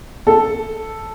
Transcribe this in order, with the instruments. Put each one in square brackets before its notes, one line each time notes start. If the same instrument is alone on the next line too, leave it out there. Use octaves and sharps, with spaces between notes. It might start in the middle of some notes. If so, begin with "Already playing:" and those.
[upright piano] A4